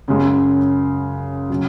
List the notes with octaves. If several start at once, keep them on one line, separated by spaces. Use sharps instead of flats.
F#2 C#3 G#3
C#3 F#3